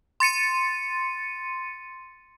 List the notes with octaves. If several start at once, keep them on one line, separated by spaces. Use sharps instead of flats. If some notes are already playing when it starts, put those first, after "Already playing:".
C6 A6 C#7 D#7